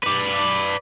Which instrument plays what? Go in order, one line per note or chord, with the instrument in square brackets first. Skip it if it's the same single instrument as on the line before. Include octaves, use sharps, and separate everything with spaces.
[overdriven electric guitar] B4 D5